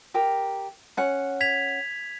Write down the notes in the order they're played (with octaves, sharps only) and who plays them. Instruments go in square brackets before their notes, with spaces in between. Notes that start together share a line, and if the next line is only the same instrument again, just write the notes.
[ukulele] G4 A#4
C#4 F#5
[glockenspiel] G#6 B6 F7